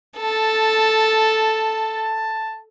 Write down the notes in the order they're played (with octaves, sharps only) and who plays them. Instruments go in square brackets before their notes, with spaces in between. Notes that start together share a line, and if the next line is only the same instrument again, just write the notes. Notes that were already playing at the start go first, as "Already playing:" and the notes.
[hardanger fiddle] A4 [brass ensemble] A5